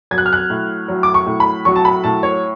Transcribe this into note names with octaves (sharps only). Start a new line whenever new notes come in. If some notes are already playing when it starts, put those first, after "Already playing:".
F#3 G#6
F#6
F6
F#6
A2
F#3
D6
C#6
A2
B5
F#3 C#6
A5
B5
A2 A5
C#5